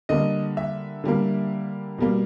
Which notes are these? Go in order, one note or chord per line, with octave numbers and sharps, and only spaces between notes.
D3 G3 A#3 D#5
E5
D3 G3 A#3
B2 G3 A#3